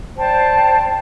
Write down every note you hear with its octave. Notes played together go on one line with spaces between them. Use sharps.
C5 D5 G5 A5